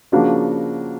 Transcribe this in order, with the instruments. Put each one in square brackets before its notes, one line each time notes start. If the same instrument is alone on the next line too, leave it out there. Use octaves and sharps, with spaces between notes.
[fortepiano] C#3 F3 A#3 D4 F#4